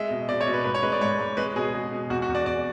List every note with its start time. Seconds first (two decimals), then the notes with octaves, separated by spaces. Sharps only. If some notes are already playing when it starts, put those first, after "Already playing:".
Already playing: G#3 E5
0.10 B2
0.29 B2 D5
0.41 C#5
0.47 B2
0.53 B4
0.64 G#2 B4
0.75 C#5
0.83 G#3 B4
0.92 D5
1.01 G#2 C#5
1.19 G#2
1.37 G#3 B4
1.56 B2 G#4
1.74 B2
1.92 B2
2.10 E2 F#4
2.22 F#4
2.29 E2
2.35 D5
2.46 E2 D5